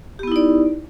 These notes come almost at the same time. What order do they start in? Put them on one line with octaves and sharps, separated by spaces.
G4 B3 E4 D#4 D5